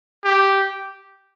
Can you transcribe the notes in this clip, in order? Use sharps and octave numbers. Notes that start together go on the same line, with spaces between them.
G4